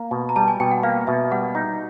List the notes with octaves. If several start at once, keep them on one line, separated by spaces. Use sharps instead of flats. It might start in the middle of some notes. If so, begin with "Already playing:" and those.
Already playing: A#3
B2
A#5
G3 A5
G#5
B2 G5
F#5
A#3 F5
B2 E5
G3 F#5
D#4